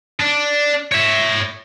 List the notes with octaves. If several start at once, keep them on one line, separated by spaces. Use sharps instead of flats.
D4
C#5 E5